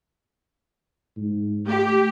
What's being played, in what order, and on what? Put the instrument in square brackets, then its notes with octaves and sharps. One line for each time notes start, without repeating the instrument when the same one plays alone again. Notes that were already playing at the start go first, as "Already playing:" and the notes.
[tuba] G#2
[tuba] A3 [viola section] G4